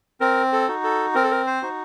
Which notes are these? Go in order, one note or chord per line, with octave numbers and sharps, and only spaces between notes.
C4 A#4
A4
D#4 F#4
A4
C4 A#4
A4
A#4
C5
D#4 F#4